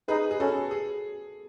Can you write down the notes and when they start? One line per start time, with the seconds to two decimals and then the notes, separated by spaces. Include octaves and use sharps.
0.08 D#4 G#4 B4
0.31 G#4
0.40 C#4 F#4 A4
0.71 G#4